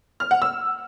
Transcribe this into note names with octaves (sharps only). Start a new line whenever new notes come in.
F6
F#5
E6